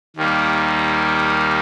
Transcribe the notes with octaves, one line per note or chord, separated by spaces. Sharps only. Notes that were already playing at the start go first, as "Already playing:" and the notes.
D#2 D#3 G3 A#3